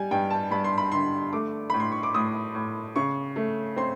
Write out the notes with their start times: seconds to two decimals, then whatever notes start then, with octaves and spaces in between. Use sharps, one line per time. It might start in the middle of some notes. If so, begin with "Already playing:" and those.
Already playing: G3 G#5
0.11 G2 G5
0.30 A5
0.51 G2 B5
0.64 C6
0.78 B5
0.92 D3 C6
1.32 A3 D6
1.70 A2 B5
1.80 C6
1.92 C#6
2.03 D6
2.14 A2 D#6
2.55 A2
2.96 C#3 C#6
3.36 A3
3.76 C4 C6